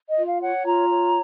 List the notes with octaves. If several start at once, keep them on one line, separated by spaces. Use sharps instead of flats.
D#5
F4
F5
C#5 F#5
F4 A#5
C#5